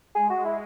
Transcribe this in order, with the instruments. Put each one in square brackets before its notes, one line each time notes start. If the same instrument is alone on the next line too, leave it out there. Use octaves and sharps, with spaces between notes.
[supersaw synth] G#3 [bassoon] G#4
[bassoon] F#4
E4